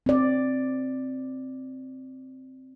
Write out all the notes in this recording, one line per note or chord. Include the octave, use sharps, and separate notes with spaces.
C4 D5